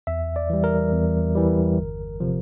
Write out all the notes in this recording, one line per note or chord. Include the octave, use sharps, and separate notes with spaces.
E2 E5
D5
E3 G3
A#4
E2
E3 G3
G1
C3 F3